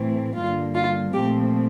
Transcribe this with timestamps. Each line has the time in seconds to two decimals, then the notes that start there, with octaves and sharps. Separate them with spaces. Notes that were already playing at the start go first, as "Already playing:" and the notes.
Already playing: A2 E3 A3 C4
0.35 G2 D3 G3 A#3 F4
0.74 F4
1.13 A#2 F3 A3 C4 G4